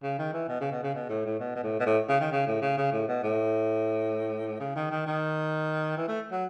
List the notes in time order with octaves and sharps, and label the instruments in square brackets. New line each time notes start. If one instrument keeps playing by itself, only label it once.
[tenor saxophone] C#3
D#3
E3
B2
C#3
B2
C#3
B2
A2
A2
B2
B2
A2
B2
A2
C#3
D#3
C#3
A2
C#3
C#3
A2
B2
A2
C#3
D#3
D#3
D#3
E3
A3
F#3